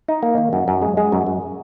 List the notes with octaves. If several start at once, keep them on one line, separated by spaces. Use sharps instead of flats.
D#4
A#3
D#3
F#2
F#2
G#3
G#3
F#2
F#2